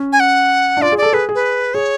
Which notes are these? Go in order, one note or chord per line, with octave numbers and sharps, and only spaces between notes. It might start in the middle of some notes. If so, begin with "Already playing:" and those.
Already playing: C#4
G#5
F#5
D4
F4 D5
G#4
A4 D5
G#4 B4
G#4
B4
G#4 C#5